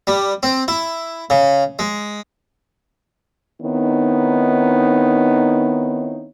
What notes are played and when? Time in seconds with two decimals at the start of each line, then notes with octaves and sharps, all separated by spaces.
0.07 G3
0.43 C4
0.68 E4
1.30 C#3
1.79 G#3
3.62 D#3 B3 C4 D#4 E4 C#5